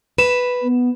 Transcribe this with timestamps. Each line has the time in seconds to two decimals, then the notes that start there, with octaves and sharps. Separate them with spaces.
0.18 B4 E7
0.62 B3